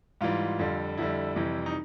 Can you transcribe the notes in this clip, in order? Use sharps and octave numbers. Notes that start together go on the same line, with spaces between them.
G#2 E3 G3 F4
F2 D3 G3
F2 D3 G3 E4
F2 C3 E3 G3
D#4